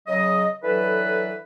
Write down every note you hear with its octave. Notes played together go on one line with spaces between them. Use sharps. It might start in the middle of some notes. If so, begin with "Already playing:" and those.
C#3 F#3 D#5
D3 E3 F#3 A4 B4